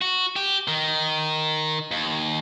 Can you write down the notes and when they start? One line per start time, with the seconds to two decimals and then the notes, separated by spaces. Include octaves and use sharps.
0.02 F#4
0.36 G4
0.68 D#3
1.91 D#2